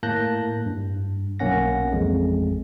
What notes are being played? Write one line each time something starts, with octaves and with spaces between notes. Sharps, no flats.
A2 A#3 A5 F#6 G6 A#6
G2
B1 A#3 C#4 F#5 A#6
A1 F2 G#3